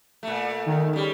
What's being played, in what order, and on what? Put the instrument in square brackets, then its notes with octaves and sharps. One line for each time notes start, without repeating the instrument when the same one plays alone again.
[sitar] A#2 A3
[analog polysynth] D#3
[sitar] C#3 G3